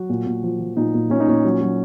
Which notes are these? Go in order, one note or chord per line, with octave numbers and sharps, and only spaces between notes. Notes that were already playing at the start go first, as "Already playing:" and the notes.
Already playing: F#3 F#4
A#2
A#2
F3
F3
A#2 D#4
A#2
A#2 C#4
D#4
A#2 C#4
F#3
F#3